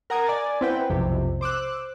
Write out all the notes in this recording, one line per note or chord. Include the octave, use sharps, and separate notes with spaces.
A#4 F#5 A#5 D#6 G#6
D5 G#5 A6
C4 E4 B4 F#5 G5
B1 F2 C3
C5 D6 E6 F#6